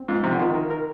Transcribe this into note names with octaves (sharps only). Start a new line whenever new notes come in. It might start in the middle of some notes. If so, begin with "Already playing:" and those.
Already playing: C4
G#2 F4
C3 F3
D3
D#3 F4
A#4
A#4